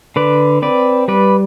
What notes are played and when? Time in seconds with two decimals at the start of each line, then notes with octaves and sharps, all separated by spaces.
0.16 D3 B4 D5
0.62 C4 B4 D5
1.08 G3 B4 D5